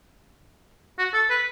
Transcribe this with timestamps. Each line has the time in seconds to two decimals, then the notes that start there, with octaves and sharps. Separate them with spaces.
0.98 F#4
1.14 A4
1.30 B4